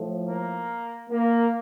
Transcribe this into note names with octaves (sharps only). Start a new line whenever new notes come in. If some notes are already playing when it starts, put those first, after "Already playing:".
Already playing: A2 F3 A3
A#3
A#3